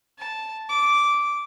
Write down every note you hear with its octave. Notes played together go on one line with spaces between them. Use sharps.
A5
D6